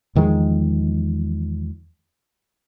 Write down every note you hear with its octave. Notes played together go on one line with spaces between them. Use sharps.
E2 D#3 F3 G#3